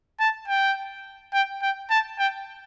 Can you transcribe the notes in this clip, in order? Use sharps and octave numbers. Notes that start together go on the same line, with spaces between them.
A5
G5
G5
G5
A5
G5